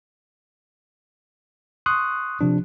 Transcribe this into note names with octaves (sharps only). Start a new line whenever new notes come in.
C6 C#6 D#6 F#6
C3 F3 D4